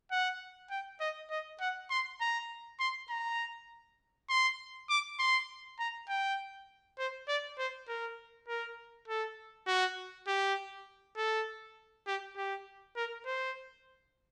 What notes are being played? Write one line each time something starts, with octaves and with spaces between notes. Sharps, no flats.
F#5
G5
D#5
D#5
F#5
C6
A#5
C6
A#5
C6
D6
C6
A#5
G5
C5
D5
C5
A#4
A#4
A4
F#4
G4
A4
G4
G4
A#4
C5